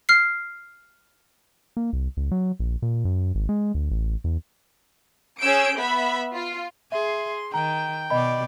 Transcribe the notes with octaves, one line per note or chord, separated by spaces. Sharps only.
F6 C7
A#3
C2
C#2
F#3
A#1
A#2
F#2
G#1
G#3
D2
A1
E2
C#4 G#4 E6 G6 D7
B3 E5 B5
F4
G#4 E5 C6
D#3 G5 A#5
B2 D5 D#5 B5